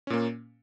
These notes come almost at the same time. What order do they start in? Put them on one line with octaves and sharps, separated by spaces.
C#4 A#2 A#3